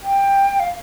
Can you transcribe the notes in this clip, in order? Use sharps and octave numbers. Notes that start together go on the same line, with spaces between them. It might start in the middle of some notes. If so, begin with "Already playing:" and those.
G5
F5